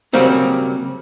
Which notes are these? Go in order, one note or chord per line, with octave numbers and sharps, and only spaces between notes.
C#3 F#3 G3 A#3 C4 C#4